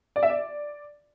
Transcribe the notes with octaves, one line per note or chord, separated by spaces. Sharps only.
D5
E5
D5